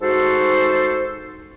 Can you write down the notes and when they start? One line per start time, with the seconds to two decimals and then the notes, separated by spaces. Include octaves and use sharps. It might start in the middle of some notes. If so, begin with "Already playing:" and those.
0.01 G#2 F#4 A4 C5